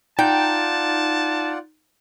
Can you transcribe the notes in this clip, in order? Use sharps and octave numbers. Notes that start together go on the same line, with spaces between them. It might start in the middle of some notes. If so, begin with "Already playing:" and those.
D#4 F4 D5 F#5 G5 A5